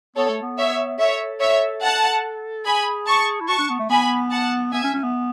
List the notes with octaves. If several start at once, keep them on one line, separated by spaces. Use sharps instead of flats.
B3 A4 C#5
A3
B3
C#5 E5
A4 C#5 E5
C#5 E5
F#5 A5
G#4 G#5 B5
A5 C#6
E4
F#4 A5 C#6
D4
B3
A3
B3 G#5 B5
F#5 A5
B3 E5 G#5
C#4
C#4
B3